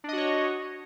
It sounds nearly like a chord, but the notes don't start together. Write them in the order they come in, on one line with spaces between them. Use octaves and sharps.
D4 D#5 F#4 C#5